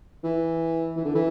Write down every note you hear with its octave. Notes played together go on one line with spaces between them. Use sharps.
E3
E3
D3
E3